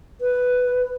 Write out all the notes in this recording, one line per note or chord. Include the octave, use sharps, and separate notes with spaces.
B4